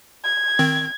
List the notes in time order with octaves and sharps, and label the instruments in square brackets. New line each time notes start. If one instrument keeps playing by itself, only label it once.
[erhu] G#6
[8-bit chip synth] D#3 C4